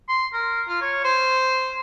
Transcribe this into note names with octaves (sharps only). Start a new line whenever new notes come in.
C6
A#4
F4
C#5
C5